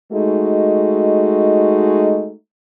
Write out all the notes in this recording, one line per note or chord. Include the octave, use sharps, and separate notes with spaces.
G#3 A3 D#4 F#4